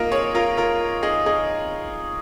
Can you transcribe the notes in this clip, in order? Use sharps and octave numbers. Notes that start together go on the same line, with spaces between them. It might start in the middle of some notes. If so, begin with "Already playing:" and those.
Already playing: A#3 D#4 F4 A#4
G#4 C#5
F4 A#4
F4 A#4
D#4 G#4
D#4 G#4